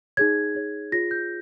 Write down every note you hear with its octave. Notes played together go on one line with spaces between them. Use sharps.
D#4 G#4 C#5 G#6
D#4 G#4 C#5
F4 G#4 C#5 A#6
G6